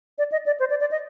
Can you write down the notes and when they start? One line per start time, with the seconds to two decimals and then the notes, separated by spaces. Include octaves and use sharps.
0.18 D5
0.32 D#5
0.46 D5
0.60 C5
0.70 D5
0.80 D5
0.91 D#5